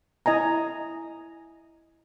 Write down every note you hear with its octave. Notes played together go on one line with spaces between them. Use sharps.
E4 D#5 G#5 A#5